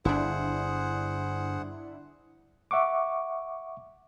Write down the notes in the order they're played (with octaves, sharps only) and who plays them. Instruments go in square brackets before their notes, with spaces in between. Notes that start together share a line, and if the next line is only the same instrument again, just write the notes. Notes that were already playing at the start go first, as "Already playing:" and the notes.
[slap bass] G1 [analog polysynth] D4 E4 [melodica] G#4 C5 F#5
[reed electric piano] E5 F#5 C#6 D6